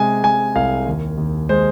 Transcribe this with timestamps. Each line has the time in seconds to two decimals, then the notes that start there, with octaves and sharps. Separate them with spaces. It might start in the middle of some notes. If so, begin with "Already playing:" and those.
Already playing: C3 G#3 G#5
0.23 G#3 G#5
0.55 C2 F5
0.87 D#2
1.18 D#2
1.49 G#3 C5